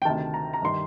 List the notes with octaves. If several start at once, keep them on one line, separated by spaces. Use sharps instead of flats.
G5
D2 C3 D#3 A5
A#5
A#5
G2 D#3 C6